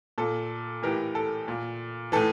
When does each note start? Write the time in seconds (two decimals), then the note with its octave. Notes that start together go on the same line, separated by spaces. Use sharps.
0.18 A#2 A4
0.82 A2 E3 G4 A#4
1.15 A4
1.48 A#2
2.12 A2 E3 A4